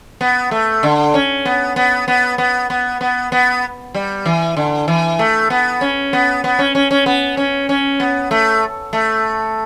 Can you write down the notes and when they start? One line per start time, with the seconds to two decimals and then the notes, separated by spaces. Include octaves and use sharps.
0.21 B3
0.51 A3
0.83 D3
1.14 C#4
1.45 B3
1.76 B3
2.08 B3
2.38 B3
2.70 B3
3.01 B3
3.32 B3
3.94 G3
4.26 E3
4.57 D3
4.88 E3
5.19 A3
5.50 B3
5.81 C#4
6.13 B3
6.44 B3
6.59 C#4
6.75 C#4
6.91 C#4
7.06 B3
7.37 C#4
7.69 C#4
8.00 B3
8.31 A3
8.93 A3